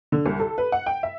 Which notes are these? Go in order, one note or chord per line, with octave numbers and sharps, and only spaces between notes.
D3
C2
A4
B4
F#5
G5
E5